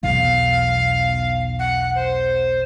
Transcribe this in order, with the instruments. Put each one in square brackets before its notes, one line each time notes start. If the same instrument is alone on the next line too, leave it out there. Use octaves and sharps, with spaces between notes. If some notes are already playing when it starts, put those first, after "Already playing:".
[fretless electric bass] B1 E2 [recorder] F5
[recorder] F#5
C5